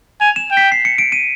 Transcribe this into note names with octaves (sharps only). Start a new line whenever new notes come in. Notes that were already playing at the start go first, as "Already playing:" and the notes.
G#5 F7
E7
G5
B6
C7
C#7
D7
D#7